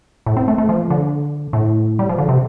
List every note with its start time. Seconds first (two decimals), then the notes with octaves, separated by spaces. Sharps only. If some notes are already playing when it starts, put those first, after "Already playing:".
0.26 A2
0.37 C4
0.48 A3
0.58 A3
0.69 F3
0.90 D3
1.53 A2
1.99 G3
2.09 F3
2.18 D3
2.29 C3